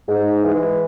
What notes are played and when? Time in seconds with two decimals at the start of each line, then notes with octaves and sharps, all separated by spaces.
0.08 G#2
0.44 E3 G#3